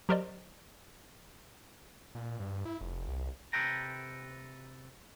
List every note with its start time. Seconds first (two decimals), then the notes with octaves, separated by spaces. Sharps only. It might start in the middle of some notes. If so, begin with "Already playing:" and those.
0.09 F#3 G4 A#4 C5 D5 D#5
2.15 A#2
2.40 G2
2.65 E4
2.81 F1
3.08 C2
3.53 C3 A4 B4 G5 A#5